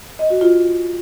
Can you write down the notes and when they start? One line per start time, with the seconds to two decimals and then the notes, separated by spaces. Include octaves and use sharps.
0.19 D#5
0.30 F#4
0.41 F4